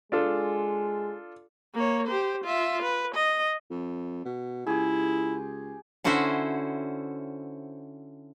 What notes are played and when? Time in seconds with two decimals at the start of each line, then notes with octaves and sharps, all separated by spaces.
0.12 G#3 D4 F4 A4
1.74 A#3 C#5
2.07 G4 C5
2.44 F4 E5
2.82 B4
3.15 D#5
3.71 F2
4.25 B2
4.67 C#2 E4 G4 G#4
6.04 D3 C#4 E4 F#4 C5 E5